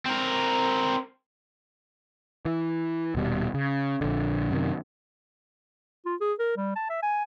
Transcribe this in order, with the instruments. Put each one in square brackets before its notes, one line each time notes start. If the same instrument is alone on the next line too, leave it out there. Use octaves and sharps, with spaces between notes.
[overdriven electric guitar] C4 A#4
[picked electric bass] E3
D#1 B2 G3
C#3
A#1 D3
F#2 C3 D#3
[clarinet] F4
G#4
A#4
G3
A5
E5
G#5